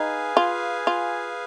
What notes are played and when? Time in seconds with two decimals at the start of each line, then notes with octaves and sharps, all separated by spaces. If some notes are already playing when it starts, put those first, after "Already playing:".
Already playing: D#4 G#4 B4 F5 G#5
0.37 F4
0.87 F4